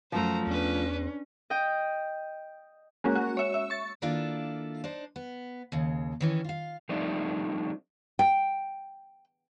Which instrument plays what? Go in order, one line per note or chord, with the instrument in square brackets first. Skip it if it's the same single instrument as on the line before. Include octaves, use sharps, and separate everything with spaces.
[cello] F#2 [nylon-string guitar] F3 A3 [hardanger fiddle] C5 A#5
[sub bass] E2 [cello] C#4 [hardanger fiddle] D4 B4
[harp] D#5 G5
[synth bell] G#3 A#3 C#4 F#4
F#4
C#5 E5
E5
C#6 A6
[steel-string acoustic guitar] D#3 A#3 D4 E4 F4 A4
D4 D#4 C5
B3
D#2 C#3
D#3 E3 C#4
F4 F5
[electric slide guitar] F3 G3 A3 C4 D4 D#4
[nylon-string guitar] G5